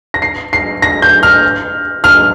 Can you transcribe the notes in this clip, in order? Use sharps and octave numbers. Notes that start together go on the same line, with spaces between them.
A#6
C7
C7
A#6
G6
F6
F6